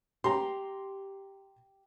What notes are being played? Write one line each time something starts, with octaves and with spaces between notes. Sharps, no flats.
G4 A#5 C6